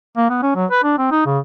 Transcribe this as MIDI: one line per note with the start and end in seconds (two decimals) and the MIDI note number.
0.17 0.27 58
0.30 0.39 59
0.43 0.52 61
0.55 0.66 54
0.71 0.82 71
0.84 0.94 62
0.98 1.09 60
1.12 1.21 63
1.26 1.39 49